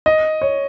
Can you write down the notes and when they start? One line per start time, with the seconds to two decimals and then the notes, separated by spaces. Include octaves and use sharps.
0.06 D#5
0.42 C#5